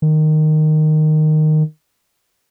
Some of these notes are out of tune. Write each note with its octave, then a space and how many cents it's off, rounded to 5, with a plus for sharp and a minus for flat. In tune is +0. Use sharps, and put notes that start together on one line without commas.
D#3 -10